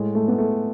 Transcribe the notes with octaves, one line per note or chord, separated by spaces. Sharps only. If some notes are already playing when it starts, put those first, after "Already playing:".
Already playing: A2 G#3
A3
B3
A3